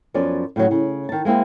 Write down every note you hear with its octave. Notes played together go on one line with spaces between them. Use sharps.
F#2 F3 B3 C#4 D5
A2 C#3 E3 F#3
C#3
D#3 A5
G#3 A#3 C4 E4